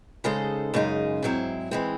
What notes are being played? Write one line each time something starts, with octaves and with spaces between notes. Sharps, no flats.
C#3 G#3 D#4 A4 C5
F#2 C#3 G#3 D#4
G#2 F#3 C4 E4
E3 G#3 C4